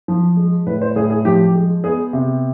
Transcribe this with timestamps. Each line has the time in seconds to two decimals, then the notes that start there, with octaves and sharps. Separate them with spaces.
0.08 F3
0.37 G#3
0.66 A2 B4
0.82 C5
0.96 A2 G#4
1.10 G#4
1.25 F3 G4
1.55 G#3
1.84 B3 G#4
2.13 C3